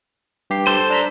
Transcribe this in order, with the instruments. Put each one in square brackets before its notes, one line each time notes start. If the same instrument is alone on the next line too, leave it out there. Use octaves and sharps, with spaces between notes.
[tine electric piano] G2 G4 C7
[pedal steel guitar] A4 C5
[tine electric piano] D4 A#5 B6